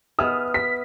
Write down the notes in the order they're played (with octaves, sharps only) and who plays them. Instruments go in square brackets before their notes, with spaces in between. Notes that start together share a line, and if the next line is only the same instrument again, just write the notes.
[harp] B3 G#4 E5 [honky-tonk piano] D#6 F6
[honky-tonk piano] B6